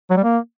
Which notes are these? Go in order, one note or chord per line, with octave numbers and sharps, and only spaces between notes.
F#3
G3
A#3